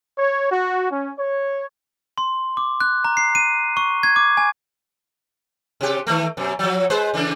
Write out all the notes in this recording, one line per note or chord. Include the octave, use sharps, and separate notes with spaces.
C#5
F#4
C#4
C#5
C6
D6
F#6
A#5
C7
D#7
C#6
G#6
D6
G#5
C3 G4
D#3 A3
F#2 B2
F3 F#3
G#3 B4 C5
C#3 E3 D4